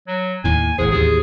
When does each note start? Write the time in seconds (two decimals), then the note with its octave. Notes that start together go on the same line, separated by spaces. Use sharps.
0.07 F#3
0.44 D#2 A2 G#5
0.78 G#1 A2 G#4 C5
0.92 D#2 A2 E3 G4 G#4